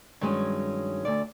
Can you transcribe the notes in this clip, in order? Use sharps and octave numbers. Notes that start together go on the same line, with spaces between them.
G2 D#3 F#3 G#3 C#4
D2 A4 D5